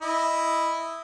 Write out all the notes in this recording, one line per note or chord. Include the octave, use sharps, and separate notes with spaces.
E4 D#5